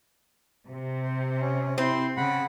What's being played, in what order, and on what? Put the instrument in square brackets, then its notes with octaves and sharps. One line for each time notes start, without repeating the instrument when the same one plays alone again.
[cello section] C3
[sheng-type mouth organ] C5
C#4
[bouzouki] C4 [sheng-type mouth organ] E4 C5 C6
[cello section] C#3 [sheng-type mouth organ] F#5 B5